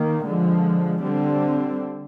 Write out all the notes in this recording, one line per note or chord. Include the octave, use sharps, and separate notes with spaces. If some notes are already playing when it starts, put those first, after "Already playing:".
Already playing: D#3 A#3
D3 F3 G#3
D3 G3 C4